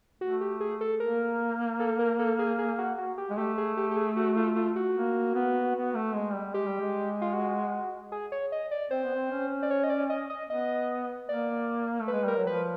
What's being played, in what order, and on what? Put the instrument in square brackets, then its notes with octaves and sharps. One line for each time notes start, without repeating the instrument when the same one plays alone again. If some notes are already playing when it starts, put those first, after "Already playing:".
[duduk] A3 [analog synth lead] F#4
[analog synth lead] G4
G#4
A4
[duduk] A#3 [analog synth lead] A#4
[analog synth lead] A4
A#4
A4
G#4
G#4
F#4
F#4
G4
[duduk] G#3
[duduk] A3 [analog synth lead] G4
[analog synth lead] G#4
G4
G4
G#4
F#4
F4
F4
F#4
[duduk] A#3
B3
B3
A3
G#3
G3
[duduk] G#3 [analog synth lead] G4
[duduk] G3
G#3
[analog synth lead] F4
F#4
G#4
C#5
D#5
D5
[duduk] C4 [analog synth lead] C5
[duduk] B3
C4
C#4
[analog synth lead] D5
C#5
D#5
D5
D#5
D#5
[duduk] B3 [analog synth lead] D#5
[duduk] A#3 [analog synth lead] D5
[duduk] A3
[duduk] G#3 [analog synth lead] B4
[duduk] G3 [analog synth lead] A#4
[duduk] F#3
[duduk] F3 [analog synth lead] B4